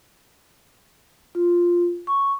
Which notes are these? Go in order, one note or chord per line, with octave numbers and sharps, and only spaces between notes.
F4
C#6